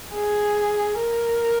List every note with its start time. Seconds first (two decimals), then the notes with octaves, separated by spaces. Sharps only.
0.15 G#4
1.00 A#4